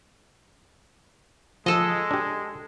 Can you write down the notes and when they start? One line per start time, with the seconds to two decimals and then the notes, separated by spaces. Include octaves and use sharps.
1.66 F3 G#3 A4 D#5
2.11 D4 G4